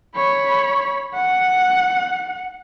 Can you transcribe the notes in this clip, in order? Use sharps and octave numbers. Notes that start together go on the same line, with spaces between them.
C#5 B5
F#5